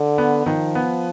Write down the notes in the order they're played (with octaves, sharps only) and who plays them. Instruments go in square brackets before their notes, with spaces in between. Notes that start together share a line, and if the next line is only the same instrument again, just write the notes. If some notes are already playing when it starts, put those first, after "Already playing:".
Already playing: [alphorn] D3
[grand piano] B3
[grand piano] D#3 [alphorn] F3
[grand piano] B3